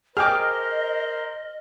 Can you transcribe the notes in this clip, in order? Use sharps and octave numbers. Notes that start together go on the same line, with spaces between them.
G#4 A#4 C5 D#5 G5 D6 F6